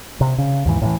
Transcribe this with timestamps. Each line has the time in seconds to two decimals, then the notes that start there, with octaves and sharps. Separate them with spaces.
0.21 C3
0.38 C#3
0.66 D#2 G#2 E3
0.82 A2 D#3 E3